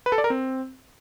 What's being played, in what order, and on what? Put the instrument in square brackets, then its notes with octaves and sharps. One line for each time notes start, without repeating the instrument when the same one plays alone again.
[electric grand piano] B4
A4
D5
A#4
C4